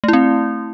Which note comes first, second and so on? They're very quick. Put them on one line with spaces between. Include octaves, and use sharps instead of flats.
A3 E4 C4